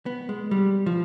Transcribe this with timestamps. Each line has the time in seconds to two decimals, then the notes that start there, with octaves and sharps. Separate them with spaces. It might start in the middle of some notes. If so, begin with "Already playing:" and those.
0.06 B3
0.29 G#3
0.51 G3
0.86 F3